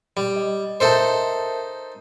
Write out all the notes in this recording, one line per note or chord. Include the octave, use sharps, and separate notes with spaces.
G3
D#5
D#4 A4 A#4 C5 E5 A5